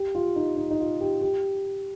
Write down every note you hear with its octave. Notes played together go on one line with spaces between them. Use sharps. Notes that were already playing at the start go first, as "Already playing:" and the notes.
Already playing: G4
F4
D#4
D#4
D#4
F4
G4
G4